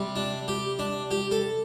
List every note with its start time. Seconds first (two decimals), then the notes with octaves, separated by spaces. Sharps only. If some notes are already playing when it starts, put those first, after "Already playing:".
Already playing: C3 G3
0.16 D4
0.48 G4
0.79 D4
1.11 G4
1.31 A4